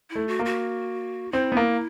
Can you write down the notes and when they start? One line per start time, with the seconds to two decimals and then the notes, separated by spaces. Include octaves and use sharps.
0.10 E4
0.15 A3
0.28 F#4
0.39 A#3
0.45 F#4
1.32 C4 E4
1.52 B3
1.57 A#3